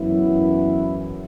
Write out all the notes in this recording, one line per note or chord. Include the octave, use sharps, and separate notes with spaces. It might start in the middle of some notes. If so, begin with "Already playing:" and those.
Already playing: F#2 E3 B3 E4